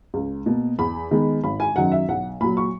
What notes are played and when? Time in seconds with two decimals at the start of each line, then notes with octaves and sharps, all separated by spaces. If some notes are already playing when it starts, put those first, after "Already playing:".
0.14 C#2
0.46 B2 A#3
0.79 E2 B5
1.11 D#3 G#3 B3
1.44 G#1 B5
1.60 G#5
1.76 F#2 D#3 F#3 F#5
1.92 E5
2.08 B1 F#5
2.41 A#2 F#3 B5
2.57 C#6